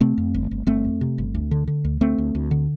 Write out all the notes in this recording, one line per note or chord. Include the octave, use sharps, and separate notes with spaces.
C3 A3 C4
F2
G1
G1
G1 A3 C4
F2
C3
G1
D2
D3
D3
D2
D2 A3 C4
D2
D2
D3